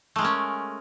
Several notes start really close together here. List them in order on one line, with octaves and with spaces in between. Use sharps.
A3 G#3 A#4 C#4